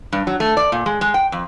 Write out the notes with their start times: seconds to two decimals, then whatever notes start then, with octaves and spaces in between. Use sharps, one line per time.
0.12 G2
0.27 F#3
0.40 A3
0.57 D5
0.72 A#2
0.86 G#3
1.01 G#3
1.14 G5
1.32 F2